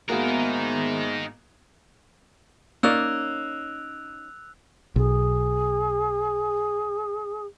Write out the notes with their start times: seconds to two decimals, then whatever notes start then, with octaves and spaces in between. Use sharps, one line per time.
0.09 G#2 A#3 B3 D#4 F#4 G#4 A#4 E5
2.83 A#3 C#4 D#4 D5 E6 F#6 F7
4.96 B1 G#4